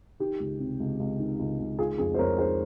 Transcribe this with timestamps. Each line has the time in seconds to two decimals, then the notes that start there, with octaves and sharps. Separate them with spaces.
0.20 D#3 G4
0.40 C#2
0.59 C3
0.80 C#2
0.99 C#2
1.19 D#3
1.39 C#2
1.59 C#2
1.79 D#3 F4 G#4
1.98 F2 F4 G#4
2.14 C5
2.19 F2 A#4 C#5
2.38 D#3 G#4 C5